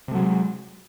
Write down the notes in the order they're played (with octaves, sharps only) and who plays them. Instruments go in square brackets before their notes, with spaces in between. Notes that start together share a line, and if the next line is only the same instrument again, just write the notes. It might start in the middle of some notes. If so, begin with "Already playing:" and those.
[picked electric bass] C3
A3
F#3
G#3